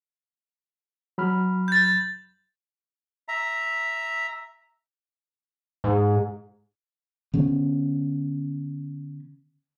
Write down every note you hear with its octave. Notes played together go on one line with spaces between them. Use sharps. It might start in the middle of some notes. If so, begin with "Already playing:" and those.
F#3 B5 F6
G6 A6
E5 A#5
G#2
D3 B3 C#4